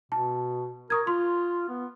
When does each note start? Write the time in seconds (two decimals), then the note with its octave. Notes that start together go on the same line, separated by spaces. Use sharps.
0.12 B2 A5
0.90 A#4 C#6 D#6 G#6
1.07 F4 C6
1.69 B3